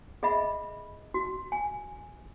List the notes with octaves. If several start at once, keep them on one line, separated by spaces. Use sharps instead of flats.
G#4 D#5 E5 B5
F#4
G#5